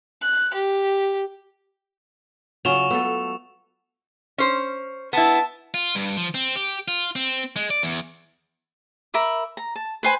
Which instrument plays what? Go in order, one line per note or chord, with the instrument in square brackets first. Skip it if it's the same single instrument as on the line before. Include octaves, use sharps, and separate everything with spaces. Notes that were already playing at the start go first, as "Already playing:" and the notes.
[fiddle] F#6
G4
[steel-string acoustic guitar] C#3 G#5 [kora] F#3 F4 [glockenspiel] C#6 E7 F7
[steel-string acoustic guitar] A3 [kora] B3 A4
[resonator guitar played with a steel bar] C#4 C5
[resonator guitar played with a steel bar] B3 E4 [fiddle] A5
[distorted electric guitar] F4
G2
F3
C4
G4
F4
C4
G#3
D5
E2
[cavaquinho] A#4 E5 B5 D6
A#5
A5
B4 C5 G#5 B5